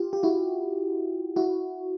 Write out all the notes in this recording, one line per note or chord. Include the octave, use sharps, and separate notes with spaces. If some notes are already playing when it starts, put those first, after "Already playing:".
Already playing: F4 G4
G4
E4 F#4
E4 F#4